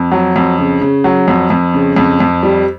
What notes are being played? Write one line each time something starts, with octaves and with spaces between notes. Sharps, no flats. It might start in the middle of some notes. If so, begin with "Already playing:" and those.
Already playing: F2
F#3
F2
C#3
C#3
F#3
F2
F2
C#3
F2
F2
G3